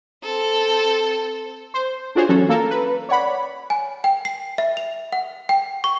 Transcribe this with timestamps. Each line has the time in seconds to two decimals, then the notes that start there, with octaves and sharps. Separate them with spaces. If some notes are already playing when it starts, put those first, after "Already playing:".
0.23 C4 A4
1.74 C5
2.15 D4 F4 F#4 G#4 C5 C#5
2.29 E3 F#3 C#4 F#4 A4
2.49 A#3 A4 A#4
2.70 B4
3.09 C#5 D5 F#5 B5
3.70 G#5
4.04 G5
4.25 C7
4.58 E5
4.77 F7
5.12 F#5
5.49 G5
5.84 C#6